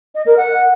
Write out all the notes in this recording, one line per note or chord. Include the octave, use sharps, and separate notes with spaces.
D#5
A#4
F#5